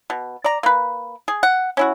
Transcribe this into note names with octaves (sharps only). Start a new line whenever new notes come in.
B2
D5 A#5
A#3 B4
G#4
F#5
C#4 E4 F#4